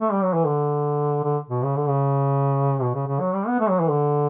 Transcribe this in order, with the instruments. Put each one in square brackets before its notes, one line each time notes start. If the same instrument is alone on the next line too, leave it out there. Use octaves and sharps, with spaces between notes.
[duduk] A3
G3
F#3
E3
D3
D3
B2
C#3
D3
C#3
B2
C#3
C#3
F#3
G3
B3
A3
F#3
E3
D3